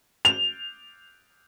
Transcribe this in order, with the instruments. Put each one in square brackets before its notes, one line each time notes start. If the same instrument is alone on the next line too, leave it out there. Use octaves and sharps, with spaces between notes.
[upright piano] F7